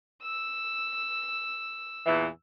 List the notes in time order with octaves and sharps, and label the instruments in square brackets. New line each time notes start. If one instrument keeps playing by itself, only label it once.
[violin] E6
[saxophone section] E2 A#2 E3